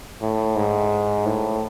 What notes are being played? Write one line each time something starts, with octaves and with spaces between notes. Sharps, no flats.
A2
G#2
A2